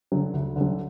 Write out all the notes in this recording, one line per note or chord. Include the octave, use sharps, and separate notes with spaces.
D3 F#3
D2
D3 F#3